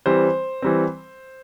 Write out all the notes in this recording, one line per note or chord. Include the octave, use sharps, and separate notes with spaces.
E3 G3 C4 C5
E3 G3 C4